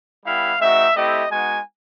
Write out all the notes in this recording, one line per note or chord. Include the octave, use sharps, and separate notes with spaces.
G3 B3 E4 G4 F5
G#3 C4 D#4 F#4 E5
A3 C4 E4 G4 D#5
G#3 B3 D#4 F#4 G#5